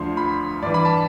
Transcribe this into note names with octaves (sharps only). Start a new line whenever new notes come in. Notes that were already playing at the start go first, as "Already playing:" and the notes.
Already playing: D2 D3 F3 C6
B5
G2 E3 D5
B5
A5